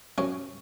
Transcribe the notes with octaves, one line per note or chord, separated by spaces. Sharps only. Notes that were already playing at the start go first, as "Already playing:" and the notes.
F#2 C#4